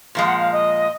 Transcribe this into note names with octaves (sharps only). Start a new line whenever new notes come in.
A#2 F3 G#3 F5
F#5
F5
D#5